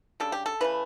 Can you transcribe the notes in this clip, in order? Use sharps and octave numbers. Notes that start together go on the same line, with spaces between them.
C#3 G3 D4 A4
G4
A4
C#3 E3 A3 B4